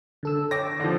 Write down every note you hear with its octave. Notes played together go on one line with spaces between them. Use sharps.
D3 A4 E6
C#5 G5 D6 A#6
D3 F3